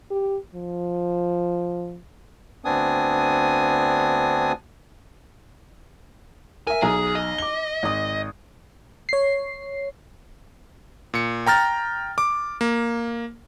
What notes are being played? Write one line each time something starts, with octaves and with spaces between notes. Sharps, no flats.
G4
F3
D2 B3 C4 D4 G#5 D#6
A#4 E5 G#5
B1 G#4 G#5 A#5
D#5
D6 G7
G#1 D#6
C#5 C7
A#2 C#7
G5 A#5 F6 A6
D6
A#3